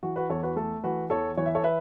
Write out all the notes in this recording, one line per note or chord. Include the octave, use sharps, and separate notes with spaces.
E3 F#4
F#4 B4
E2 A4 C#5
F#4 B4
A3 A4
E3 F#4 B4
E2 A4 C#5
E3 C#5
E5
A4 C#5
B4 E5